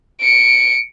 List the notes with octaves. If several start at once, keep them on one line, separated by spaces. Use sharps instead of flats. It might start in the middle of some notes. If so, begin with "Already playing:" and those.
C#7 D7